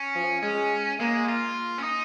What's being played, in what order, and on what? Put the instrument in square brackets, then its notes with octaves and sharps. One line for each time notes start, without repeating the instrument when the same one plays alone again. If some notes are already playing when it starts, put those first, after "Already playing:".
Already playing: [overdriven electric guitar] C#4
[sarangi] F3
[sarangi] G#3 [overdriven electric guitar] C#4
[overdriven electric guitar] G#3 [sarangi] A#3
[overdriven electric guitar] F4
C#4
D#4